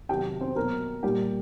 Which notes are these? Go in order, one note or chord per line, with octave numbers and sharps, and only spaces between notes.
C3 D#3 F#3 G4 G5
C4 C5
B2 F#3 A#3 A#4
A#2 G3 G4